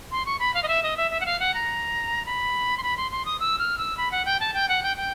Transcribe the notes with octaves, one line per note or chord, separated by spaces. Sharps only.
C6
C#6
B5
F5
D#5
E5
D#5
E5
E5
F#5
F5
F#5
A#5
B5
C6
B5
C6
C6
D#6
E6
F6
E6
B5
F#5
G5
A5
G5
F#5
G5
G5